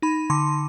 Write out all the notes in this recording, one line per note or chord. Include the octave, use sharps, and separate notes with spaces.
D#4 B5
D3 C6